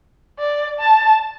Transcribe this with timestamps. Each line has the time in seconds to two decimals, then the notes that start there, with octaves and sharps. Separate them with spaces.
0.39 D5
0.79 A5